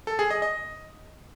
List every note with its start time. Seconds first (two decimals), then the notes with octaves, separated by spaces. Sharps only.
0.07 A4
0.19 G#4
0.30 D#5
0.42 D#5